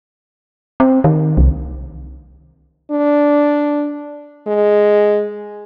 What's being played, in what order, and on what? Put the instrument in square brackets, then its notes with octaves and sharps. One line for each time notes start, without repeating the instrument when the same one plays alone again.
[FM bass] C4
D#3
C2
[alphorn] D4
G#3